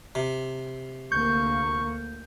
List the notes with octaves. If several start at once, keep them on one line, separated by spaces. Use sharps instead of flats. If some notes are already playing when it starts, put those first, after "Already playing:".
C3
D2 A#3 C#6 G6